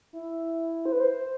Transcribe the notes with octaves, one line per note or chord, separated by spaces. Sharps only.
E4
C5
B4
C5